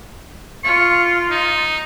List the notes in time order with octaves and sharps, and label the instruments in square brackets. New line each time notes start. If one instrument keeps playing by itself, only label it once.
[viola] F4 [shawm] C#6
[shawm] D#4